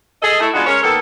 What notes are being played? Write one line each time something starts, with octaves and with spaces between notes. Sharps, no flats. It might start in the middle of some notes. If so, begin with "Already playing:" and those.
G#4 A4 D#5
A3 E4
G#3 B3 D4 D#4 F4 F#4
G#3 C#4 A#4 C#5
D#3 A#3 B3 A4